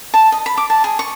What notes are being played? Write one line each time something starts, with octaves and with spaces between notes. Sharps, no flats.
A5
D#5
B5
D6
A5
G#4
C#6